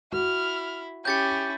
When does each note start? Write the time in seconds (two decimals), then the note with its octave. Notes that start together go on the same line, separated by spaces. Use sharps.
0.13 E4 F#4 F6
1.05 C#4 E4 G4 G6 A6 C#7